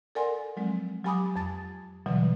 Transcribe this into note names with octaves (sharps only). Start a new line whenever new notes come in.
A4 A#4 D5 F#5 G#5 C6
F3 F#3 G#3 C4
F#3 G4 G#5 B5 D6 D#6
F2 A5 A6
B2 D3 E3 F#3 G3